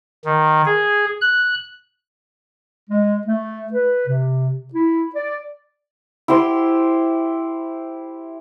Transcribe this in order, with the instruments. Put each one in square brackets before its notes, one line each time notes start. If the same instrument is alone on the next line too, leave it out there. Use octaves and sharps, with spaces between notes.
[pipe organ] D#3
G#4
F#6
[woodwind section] G#3
A3
B4
C3
E4
D5
[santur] E4 G4 C5 C6